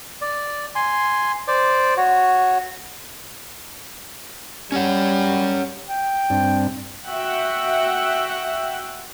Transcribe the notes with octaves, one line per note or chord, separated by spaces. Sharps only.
D5
G#5 C6
C5 D5 D6
F#4 C#5
G3 C#4 C#5 F#5
G5
G2 C4 D4
F#4 E5 F#5 G5